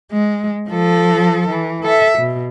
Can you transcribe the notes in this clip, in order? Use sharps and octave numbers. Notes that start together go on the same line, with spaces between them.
G#3
F3 A4
E3
A4 E5
B2